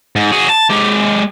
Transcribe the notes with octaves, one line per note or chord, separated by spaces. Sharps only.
G#2
F#4 G#4
A5
G#3 G4